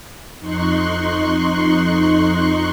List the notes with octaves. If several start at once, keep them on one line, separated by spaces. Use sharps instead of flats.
F2 D#4 C6 C#6 F#6